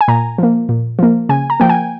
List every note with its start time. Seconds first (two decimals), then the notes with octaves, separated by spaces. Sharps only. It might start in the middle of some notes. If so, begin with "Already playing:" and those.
0.01 G#5
0.08 A#2 A#5
0.38 F3 A#3
0.69 A#2
0.99 F3 A#3
1.29 C#3 G#5
1.50 A#5
1.60 F3 A#3 G5
1.69 G#5